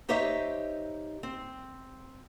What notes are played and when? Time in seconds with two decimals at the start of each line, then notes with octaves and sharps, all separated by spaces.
0.09 D#4 G4 C5 C#5 D#5 E5
1.23 C4